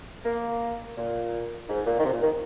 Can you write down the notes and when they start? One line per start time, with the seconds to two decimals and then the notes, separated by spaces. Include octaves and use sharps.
0.25 A#3
0.97 A#2
1.68 G#2
1.86 A#2
1.99 D#3
2.04 C3
2.13 A#2
2.22 D#3